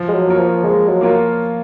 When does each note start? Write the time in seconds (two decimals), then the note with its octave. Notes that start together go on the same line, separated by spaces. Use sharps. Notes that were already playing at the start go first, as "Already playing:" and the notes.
Already playing: F3
0.09 G#3
0.15 F#3
0.27 A#3 F4 A#4 C#5
0.39 F3
0.64 F3 G#3
0.89 F#3
1.01 A#3 F4 A#4 C#5